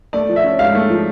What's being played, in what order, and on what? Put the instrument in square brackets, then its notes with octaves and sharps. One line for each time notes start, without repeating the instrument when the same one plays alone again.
[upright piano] A3 D5
F3
E5
C#4
G#2 F5
A3
F3